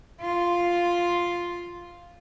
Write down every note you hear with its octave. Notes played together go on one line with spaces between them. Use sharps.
F4